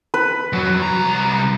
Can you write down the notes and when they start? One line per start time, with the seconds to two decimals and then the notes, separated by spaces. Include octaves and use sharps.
0.14 B4
0.53 F2 F#3
0.82 C2 A#5